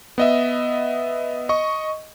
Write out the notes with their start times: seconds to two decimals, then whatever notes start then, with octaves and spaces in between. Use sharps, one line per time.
0.18 B3 D#5 E5
1.49 D#5 C#6